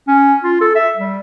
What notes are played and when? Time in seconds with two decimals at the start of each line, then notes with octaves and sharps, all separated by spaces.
0.08 C#4
0.44 F4
0.61 A4
0.75 E5
0.97 G3